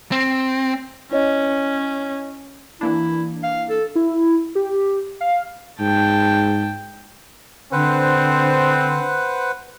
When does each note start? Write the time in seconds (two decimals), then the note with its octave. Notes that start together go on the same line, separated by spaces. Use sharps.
0.11 C4
1.11 C#4 E4 C#5 D#5
2.81 E3 A#3 D4 E4
3.43 F5
3.69 A4
3.95 E4
4.55 G4
5.21 F5
5.80 G#2 G5 A5
7.73 D3 C4 B4 C5 F#5